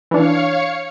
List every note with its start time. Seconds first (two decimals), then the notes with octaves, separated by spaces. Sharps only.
0.11 E3 D4 C#5 F5 C#7